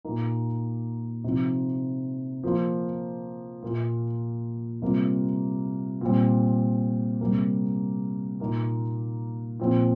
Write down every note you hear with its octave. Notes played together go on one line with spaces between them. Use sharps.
A#2 A#3 D#4
C3 F3 D#4
F3 A#3 F4
A#2 A#3 F4
C3 G3 A#3 F4
A#2 G3 C4
C3 G3 A#3
A#2 A#3 D#4
A#2 F3 C4 F4